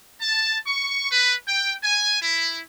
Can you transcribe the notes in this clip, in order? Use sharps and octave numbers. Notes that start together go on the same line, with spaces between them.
A5
C#6
B4
G5
G#5
E4